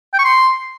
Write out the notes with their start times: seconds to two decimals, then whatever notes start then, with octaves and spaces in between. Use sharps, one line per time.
0.14 G5
0.19 C#6
0.24 C6